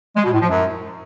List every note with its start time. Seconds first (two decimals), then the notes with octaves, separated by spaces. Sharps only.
0.17 G#3
0.25 B2
0.33 A2
0.41 F3
0.50 F#2